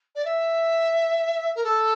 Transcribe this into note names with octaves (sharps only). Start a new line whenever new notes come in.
D5
E5
A#4
A4